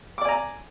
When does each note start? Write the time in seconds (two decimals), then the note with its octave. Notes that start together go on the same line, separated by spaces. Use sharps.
0.18 D6
0.21 D5
0.25 G#5
0.29 A#5